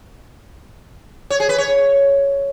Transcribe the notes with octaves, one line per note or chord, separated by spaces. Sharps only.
C#5
G#4
B4
C#5